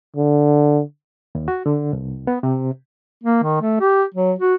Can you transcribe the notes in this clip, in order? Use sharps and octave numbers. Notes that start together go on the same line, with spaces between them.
D3
D#2
F#4
D3
C2
B3
C3
A#3
D#3
A3
G4
F#3
F#4